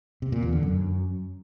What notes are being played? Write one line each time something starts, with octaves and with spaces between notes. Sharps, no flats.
C3
A#2
E2
D3
F#2